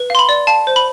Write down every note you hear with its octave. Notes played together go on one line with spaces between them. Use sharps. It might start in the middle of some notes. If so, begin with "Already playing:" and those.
Already playing: B4
F5 C6
B5
D5
F5 A5
C5
B5